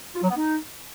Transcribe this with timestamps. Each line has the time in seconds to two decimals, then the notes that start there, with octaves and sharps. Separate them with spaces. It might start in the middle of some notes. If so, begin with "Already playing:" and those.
0.15 F4
0.23 F#3
0.30 B3
0.37 D#4